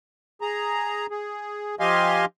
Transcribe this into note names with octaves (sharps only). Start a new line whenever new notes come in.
G#4 A#5
G#4
F3 G4 D#5 F5 G#5 C6